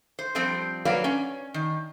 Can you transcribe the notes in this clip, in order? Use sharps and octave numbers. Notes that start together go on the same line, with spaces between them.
C5
F3 G3 C4 C5
F#3 A#3 B4 D5 F5
C#4
D#3